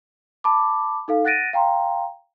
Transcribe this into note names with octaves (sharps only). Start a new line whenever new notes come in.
A5 B5 D6
D#4 A4 F5
F#5 F#6 A6 A#6 D7 D#7
F5 G5 A#5 C6